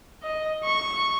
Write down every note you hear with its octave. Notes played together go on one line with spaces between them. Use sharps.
D#5
C#6